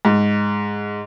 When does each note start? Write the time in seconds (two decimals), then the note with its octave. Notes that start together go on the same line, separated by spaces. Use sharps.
0.05 G#2